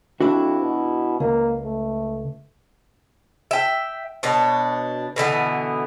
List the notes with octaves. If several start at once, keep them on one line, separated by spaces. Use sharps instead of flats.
F2 D4 E4 F#4
B2
C#2 A#3
A3
E5 G5
B2 D4 C#5
B2 D3 E3 B3